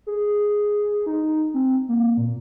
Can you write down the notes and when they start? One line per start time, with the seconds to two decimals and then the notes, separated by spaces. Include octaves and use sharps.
0.07 G#4
1.06 D#4
1.54 C4
1.89 A#3
2.17 A#2